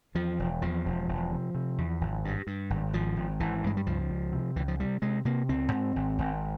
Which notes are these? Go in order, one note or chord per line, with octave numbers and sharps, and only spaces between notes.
E2 F3
E1
E2 F3
E1
E1
C3
C3
E2
G#1
G2
G2
G#1
G#1 F3
G#1
G#1 E3
G2 G#3
G3
C#2 F3
C#2
C3
C#2 E3
F3
C3 G3
C3 G#3
C3 A#3
C#2 C4
G#2
G#1
G#1